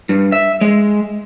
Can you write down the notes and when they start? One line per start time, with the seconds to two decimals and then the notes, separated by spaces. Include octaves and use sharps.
0.09 G2
0.32 E5
0.61 G#3